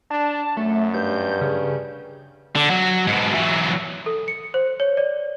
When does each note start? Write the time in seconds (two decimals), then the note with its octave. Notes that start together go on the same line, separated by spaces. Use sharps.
0.11 D4 A5
0.57 F#2 A3
0.94 G2 G6
1.41 C#3
2.56 D3
2.70 F#3
3.08 G#2 B2
3.34 E3 F#3
4.06 A4
4.28 C#7
4.54 C5
4.80 C#5
4.97 D5